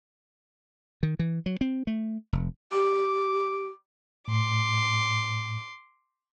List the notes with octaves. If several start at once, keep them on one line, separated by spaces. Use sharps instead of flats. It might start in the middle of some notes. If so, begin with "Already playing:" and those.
D#3
E3
F#3
C4
A3
F1
G4 D6
A2 C6 D6